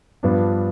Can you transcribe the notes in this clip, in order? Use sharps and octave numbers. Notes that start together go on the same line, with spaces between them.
G2 F3 B3 D4